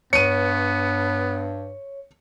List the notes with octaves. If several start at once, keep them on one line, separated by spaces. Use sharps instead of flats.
G2 B3 C#5 C#7 D#7